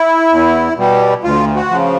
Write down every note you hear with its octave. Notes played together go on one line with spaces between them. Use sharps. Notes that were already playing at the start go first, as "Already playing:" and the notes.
Already playing: E4
E2
B2 G3
D2 F4
F#4
C#3 F3